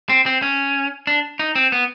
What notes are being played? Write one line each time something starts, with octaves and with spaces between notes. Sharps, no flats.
C4
C4
C#4
D4
D#4
C4
B3